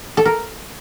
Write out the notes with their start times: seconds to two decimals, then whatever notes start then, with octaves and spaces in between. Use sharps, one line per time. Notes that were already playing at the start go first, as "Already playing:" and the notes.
0.17 A4
0.25 A#4